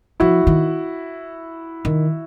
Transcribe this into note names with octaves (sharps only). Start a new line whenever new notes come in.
F3 E4 F#4
D#3
D#3